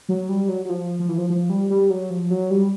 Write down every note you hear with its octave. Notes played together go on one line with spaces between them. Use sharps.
F#3
G3
F#3
F#3
F3
F3
E3
F3
F3
G3
G3
F#3
F3
F#3
G3